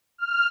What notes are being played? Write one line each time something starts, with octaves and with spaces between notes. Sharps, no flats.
F6